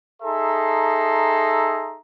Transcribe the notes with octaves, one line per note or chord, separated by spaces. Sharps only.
D#4 G#4 A4 E5 A#5 C6